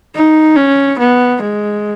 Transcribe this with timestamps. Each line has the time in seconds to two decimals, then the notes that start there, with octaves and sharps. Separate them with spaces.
0.15 D#4
0.56 C#4
0.99 B3
1.42 G#3